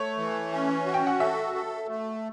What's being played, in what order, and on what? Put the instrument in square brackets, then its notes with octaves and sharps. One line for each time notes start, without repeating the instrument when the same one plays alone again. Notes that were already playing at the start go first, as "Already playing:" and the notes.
Already playing: [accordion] A3 [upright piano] C#5
[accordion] E3
C#4
F#4
[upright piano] G5
F#5
[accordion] A4 [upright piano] E5
[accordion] A4
A3